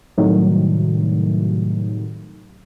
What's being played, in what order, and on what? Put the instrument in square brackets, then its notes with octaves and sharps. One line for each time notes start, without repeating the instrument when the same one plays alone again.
[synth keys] A2 C3 D#3 F#3 G3 A3